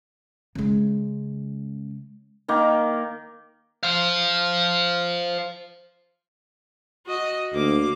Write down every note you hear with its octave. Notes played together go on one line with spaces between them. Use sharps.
C#3 G#3
D#3 A#3 D6
C5 F5
F#4 D#5
D2 A#3 D6